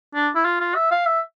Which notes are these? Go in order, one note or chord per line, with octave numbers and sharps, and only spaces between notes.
D4
E4
F4
F4
E5
F5
E5